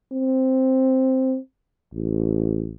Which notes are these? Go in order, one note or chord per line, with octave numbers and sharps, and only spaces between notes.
C4
A1